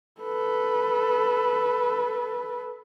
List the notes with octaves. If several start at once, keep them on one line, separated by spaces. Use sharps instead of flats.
A4 B4